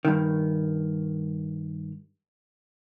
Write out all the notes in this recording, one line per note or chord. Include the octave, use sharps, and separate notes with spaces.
G2 D#3